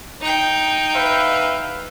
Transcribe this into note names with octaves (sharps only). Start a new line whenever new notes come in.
D#4 G5
B4 E5 F5